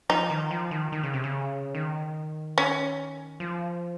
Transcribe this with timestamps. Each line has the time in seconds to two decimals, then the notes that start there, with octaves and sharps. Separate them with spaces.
0.09 F3 D#4
0.30 D#3
0.51 F3
0.71 D#3
0.92 D#3
1.03 C#3
1.14 C3
1.24 C#3
1.75 D#3
2.58 C#4
3.40 F3